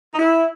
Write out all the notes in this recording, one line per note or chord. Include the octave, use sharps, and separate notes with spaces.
D#4
E4